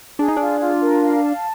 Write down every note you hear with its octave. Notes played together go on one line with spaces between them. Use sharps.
D4 G#4
D#4
D4 F4
F4
A#4
F5
A5